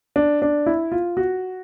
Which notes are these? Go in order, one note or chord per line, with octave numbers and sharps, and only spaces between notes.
D4
D4
E4
F4
F#4